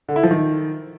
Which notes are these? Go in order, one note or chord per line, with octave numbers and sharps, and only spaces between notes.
D3
E4
F3
D#3